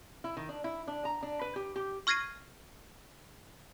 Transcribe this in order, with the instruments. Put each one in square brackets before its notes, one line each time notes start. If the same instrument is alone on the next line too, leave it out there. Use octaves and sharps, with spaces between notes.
[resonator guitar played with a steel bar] E4
D#3
D4
E4
D4
A#5
D4
B4
G4
G4
[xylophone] C#6 F6 G#6 A#6 C7 D#7